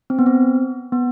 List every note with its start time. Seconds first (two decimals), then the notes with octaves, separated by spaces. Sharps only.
0.10 C4
0.19 B3
0.26 C4
0.92 B3